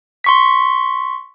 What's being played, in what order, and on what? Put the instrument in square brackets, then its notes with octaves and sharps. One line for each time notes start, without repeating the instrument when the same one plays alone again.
[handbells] C6 C#6 B6